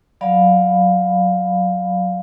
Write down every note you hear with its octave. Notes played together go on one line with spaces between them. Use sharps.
F#3 D5 F5 B5